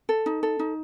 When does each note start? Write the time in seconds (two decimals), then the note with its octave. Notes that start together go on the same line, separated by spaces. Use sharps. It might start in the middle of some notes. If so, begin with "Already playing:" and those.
0.09 A4
0.26 D#4
0.43 A4
0.59 D#4